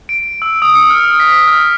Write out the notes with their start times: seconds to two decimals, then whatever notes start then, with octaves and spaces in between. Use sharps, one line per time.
0.09 D7
0.42 E6
0.62 D#6
0.75 C#7
0.90 F6
1.20 B6
1.47 F6